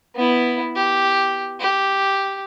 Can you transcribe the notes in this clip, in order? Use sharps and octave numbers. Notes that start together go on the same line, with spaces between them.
B3 E4
G4
G4